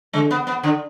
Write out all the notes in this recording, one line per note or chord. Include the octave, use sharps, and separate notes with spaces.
D3 G#3
B3
B3
D3